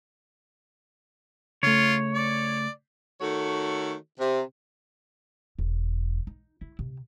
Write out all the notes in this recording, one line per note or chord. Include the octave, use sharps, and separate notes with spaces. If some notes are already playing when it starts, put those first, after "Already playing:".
C#3 A3 F4 C#5
D5
D#3 A3 F#4 A4 C#5
C3
E1
D#4
E4
C3